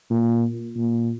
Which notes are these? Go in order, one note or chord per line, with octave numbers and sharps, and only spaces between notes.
A#2
A#2